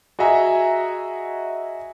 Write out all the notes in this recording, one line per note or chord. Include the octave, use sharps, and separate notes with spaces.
F#4 G#4 D#5 E5 G#5 A#5